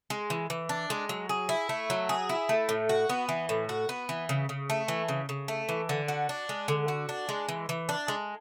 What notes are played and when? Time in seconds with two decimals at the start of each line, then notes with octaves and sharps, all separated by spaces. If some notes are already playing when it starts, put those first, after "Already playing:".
0.10 G#3
0.30 E3
0.50 E3
0.69 D4
0.90 G#3
1.09 F#3
1.29 G#4
1.49 E4
1.69 A3
1.90 F#3
2.09 G#4
2.29 E4
2.49 A3
2.69 A2
2.89 F#4
3.09 B3
3.29 E3
3.49 A2
3.69 F#4
3.89 B3
4.09 E3
4.29 C#3
4.49 C#3
4.70 A3
4.88 E3
5.08 C#3
5.29 C#3
5.48 A3
5.69 E3
5.89 D3
6.08 F#4
6.29 D4
6.49 G#3
6.68 D3
6.88 F#4
7.09 D4
7.29 G#3
7.48 E3
7.69 E3
7.89 D4
8.08 G#3